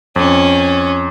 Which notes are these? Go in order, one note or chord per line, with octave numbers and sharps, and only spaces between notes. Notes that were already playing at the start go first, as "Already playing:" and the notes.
F2 C#4